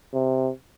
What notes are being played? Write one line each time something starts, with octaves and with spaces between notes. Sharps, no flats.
C3